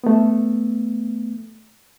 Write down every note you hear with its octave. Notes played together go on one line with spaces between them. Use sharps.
A3 B3